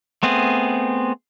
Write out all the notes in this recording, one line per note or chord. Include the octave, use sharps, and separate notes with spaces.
A3 B3 C4 G#4